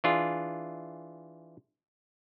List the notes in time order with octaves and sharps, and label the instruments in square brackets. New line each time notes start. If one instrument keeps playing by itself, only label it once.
[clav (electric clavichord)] E3 D4 F4 G#4